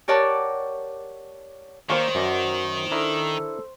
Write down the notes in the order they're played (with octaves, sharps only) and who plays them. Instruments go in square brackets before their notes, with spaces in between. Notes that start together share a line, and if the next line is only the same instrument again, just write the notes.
[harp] G4 A#4 C#5 D5 F#5 A5
[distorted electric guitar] D#3 [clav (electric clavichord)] A#3 D5 F5 [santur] C5 C#6
[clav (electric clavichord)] F#2 D5 [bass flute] F#3
[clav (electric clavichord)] D4 E4 A#4 [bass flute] A4